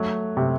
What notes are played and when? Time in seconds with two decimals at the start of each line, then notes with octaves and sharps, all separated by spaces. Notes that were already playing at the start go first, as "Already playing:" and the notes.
Already playing: F#3 A3
0.37 C3